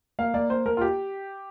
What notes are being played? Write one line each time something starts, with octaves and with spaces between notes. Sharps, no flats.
A#3 F5
A#3 D5
A#3 C5
A#3 A#4
F4
G4